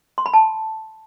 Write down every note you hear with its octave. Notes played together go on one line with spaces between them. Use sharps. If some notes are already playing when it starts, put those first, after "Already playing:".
C6
B5
A5